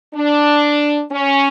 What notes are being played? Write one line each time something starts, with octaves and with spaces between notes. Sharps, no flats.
D4
C#4